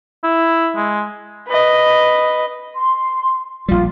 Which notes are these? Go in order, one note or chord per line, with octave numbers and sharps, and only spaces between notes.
E4
G#3
B4 D#5
C6
A#1 G3 F4